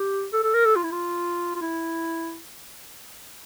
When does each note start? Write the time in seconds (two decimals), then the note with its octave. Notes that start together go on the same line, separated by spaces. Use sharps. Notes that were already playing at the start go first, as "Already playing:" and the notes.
Already playing: G4
0.33 A4
0.43 A4
0.54 A#4
0.65 A4
0.76 F4
0.84 E4
0.92 F4
1.56 F4
1.62 E4